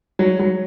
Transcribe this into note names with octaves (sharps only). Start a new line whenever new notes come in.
F#3
F#3